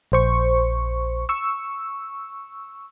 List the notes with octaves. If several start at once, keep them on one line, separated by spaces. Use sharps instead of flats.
A#1 C5 C#6
C#6 E6